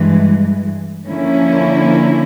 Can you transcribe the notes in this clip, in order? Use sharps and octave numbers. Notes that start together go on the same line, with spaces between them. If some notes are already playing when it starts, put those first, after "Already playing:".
Already playing: G2 E3 G#3
D3 F3 A#3 C#4 E4